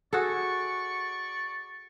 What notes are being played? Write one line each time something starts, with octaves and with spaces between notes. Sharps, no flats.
F#4 G#4 A4 D5 C#6